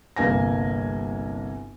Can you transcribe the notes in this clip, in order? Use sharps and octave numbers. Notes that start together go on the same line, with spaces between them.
G1 C2 A#3 G#5 A#6